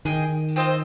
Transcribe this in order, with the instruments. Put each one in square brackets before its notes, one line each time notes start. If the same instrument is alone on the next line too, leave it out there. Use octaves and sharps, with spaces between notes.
[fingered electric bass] D#3 [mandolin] G#4 D#5 G5
[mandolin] C4 F4 C5 D#5